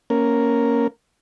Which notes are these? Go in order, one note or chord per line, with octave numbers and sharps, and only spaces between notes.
A#3 C#4 A#4